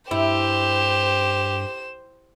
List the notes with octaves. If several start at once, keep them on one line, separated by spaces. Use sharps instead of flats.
G2 E4 G4 C5 E7